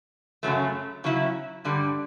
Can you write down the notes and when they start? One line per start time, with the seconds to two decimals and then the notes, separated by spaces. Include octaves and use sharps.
0.43 F#2 C#3 F#3 A3
1.04 C#3 F#3 C#4 E4
1.65 G2 D3 G3